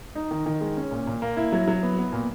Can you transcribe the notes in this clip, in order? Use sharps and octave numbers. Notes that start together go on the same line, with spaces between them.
D#4
D#3
D#3
G#3
C#4
A#2
A#2
A#3
E4
F#3
F#3
B3
B3
A#2